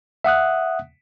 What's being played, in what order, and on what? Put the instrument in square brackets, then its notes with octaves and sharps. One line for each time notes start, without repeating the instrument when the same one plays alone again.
[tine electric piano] E5 F#5 D#6 F#6